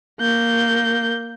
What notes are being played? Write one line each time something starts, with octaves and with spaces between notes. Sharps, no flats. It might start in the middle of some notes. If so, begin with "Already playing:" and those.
A#3 G6